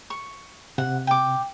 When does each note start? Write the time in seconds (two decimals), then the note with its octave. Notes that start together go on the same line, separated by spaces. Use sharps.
0.10 C#6
0.78 C3 F#5
1.07 G5 D6